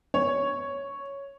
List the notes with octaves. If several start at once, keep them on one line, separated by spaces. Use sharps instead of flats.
C#5